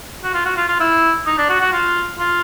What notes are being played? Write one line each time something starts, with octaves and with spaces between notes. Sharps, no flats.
F#4
F4
F#4
F4
F4
E4
D#4
D4
F#4
F#4
F4
F4